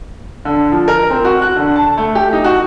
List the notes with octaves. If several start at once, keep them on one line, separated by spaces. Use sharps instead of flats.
D3
F3
A#4
C4
F#4
F#6
D3
A5
A3
G4
D#4
F#4